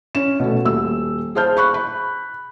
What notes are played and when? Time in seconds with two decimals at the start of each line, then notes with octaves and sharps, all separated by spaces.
0.15 C#4 E7
0.40 B2 A3
0.65 D#1 E6
1.35 G#4 C5 A5 F6 G6
1.57 B5 C#6 F#6
1.74 B5